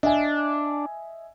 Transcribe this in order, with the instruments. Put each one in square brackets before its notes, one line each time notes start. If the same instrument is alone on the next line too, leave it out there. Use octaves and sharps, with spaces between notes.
[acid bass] D4 [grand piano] D#5 E5 G#5